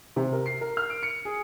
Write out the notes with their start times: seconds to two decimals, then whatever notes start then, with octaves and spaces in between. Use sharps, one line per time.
0.16 C3
0.33 A#4
0.46 C7
0.61 A#4
0.77 F6
0.90 D7
1.03 C#7
1.25 G#4